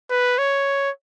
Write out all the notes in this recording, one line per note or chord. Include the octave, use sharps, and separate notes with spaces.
B4
C#5